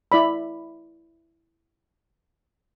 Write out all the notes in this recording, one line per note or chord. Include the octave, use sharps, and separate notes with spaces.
E4 D5 B5